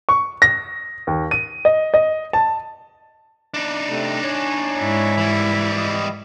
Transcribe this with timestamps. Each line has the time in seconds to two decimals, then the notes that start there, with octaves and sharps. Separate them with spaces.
0.09 C#6
0.42 A#6
1.07 D#2
1.31 D#7
1.65 D#5
1.94 D#5
2.33 A5
3.54 D4 D#4
3.89 C3 A3
4.24 C#5 G#5
4.79 G#2 E4
5.18 E3 G3
5.77 D#5